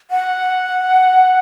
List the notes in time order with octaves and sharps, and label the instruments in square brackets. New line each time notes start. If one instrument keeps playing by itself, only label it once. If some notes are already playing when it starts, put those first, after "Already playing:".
[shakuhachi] F#5